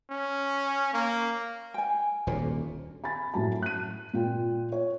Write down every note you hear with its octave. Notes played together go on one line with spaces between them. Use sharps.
C#4
A#3
G5 G#5
D#1 D2 A#2
G#5 B5 A6
F#2 A2 F#3 A5
F#6 D#7
A#2 F4 G5
C#5